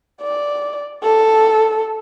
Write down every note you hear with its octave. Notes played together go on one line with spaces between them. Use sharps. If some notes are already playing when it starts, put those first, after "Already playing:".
D5
A4